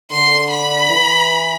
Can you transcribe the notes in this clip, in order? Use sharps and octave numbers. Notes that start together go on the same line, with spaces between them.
D3 C6
B5
E3